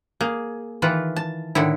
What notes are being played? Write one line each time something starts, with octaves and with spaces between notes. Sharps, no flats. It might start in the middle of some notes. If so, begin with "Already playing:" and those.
A#3 G#4
D#3 E3 F4 B4
A5
A2 D3 D#3 E4